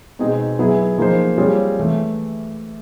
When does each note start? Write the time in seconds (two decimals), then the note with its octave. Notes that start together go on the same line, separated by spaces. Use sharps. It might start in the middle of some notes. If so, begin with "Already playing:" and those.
0.19 B2 G#3 C4 D#4 G#4
0.59 F#3 B3 E4 G#4
0.98 F3 A#3 D#4 G#4 C5
1.38 G3 C4 F4 G#4 C#5
1.79 E3 A3